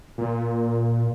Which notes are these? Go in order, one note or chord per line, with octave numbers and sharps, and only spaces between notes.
A#2